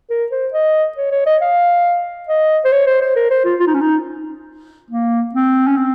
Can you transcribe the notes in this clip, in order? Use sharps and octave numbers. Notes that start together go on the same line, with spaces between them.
A#4
C5
D#5
C#5
C#5
D#5
F5
D#5
C5
C#5
C5
C5
A#4
C5
F4
F4
D#4
C#4
D#4
A#3
C4
C#4
C4